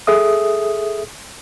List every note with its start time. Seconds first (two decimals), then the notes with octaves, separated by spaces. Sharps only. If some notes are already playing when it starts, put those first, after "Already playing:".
0.07 G#4 A4 E5 D#6